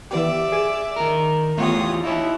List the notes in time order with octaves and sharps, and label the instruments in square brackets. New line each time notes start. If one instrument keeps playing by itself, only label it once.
[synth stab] E3 B3 G4 [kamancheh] D5 E5
[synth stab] G#4 G#5
[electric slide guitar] D#3 A#4
[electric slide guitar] E2 F4 [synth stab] A3 B3 G4 [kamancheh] C#5 D#6
[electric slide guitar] D#4 C#5 [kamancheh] E4